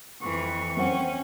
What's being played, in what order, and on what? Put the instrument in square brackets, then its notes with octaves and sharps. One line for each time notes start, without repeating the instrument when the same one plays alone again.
[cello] F2 E3 [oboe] C#6
[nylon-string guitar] C4 C5 F#5 [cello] C#4